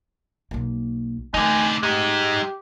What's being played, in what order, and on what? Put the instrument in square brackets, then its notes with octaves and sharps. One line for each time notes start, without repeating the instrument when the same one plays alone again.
[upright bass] B1 A#3
[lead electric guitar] D3 D#4 [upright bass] A3 C4 [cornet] G#5
[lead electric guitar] G#3 D#4 [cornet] G4